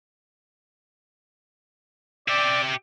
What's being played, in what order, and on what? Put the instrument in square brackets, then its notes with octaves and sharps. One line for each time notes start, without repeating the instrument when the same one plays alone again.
[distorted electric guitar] G4 E5 [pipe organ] D5